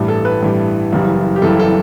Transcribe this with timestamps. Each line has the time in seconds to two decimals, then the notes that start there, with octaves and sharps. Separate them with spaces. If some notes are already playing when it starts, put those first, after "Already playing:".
Already playing: A1 G2 E3 G3
0.08 A4
0.25 B4
0.42 A1 G2 E3 G3
0.93 F#1 F#2 E3 G3
1.36 G4
1.42 F#1 F#2 E3 G3 A4
1.59 A4